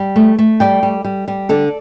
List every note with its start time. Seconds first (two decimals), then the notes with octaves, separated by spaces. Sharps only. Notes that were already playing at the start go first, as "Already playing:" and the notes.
Already playing: G3
0.16 A3
0.38 A3
0.60 G3 D5 G5
0.83 G3
1.04 G3
1.28 G3
1.49 D3 A4 D5